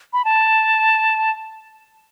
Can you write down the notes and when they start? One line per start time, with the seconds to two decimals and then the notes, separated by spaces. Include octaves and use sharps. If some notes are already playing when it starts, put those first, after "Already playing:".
0.13 B5
0.25 A5